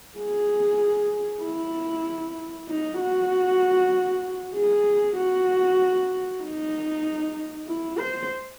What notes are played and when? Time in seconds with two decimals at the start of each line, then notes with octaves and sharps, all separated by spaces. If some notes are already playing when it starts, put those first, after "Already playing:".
0.18 G#4
1.43 E4
2.68 D#4
2.99 F#4
4.55 G#4
5.17 F#4
6.43 D#4
7.67 E4
7.99 C5